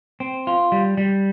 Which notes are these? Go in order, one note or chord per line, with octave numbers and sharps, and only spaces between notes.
C4
F4
G3
G3